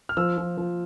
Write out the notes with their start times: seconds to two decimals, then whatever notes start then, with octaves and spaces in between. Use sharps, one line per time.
0.09 F6
0.17 F3 E6
0.38 F3
0.57 F3